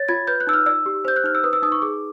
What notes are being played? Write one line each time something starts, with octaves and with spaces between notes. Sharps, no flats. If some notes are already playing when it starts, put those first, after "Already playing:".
Already playing: C#5 A6
F4 G#6
B4 G6
F#6
D#4 E6
F6
D5 E6
G4
C5 G6
F#6
D#4 F6
E6
B4 D#6
E6
D#4 D#6
C#6
G#4 D6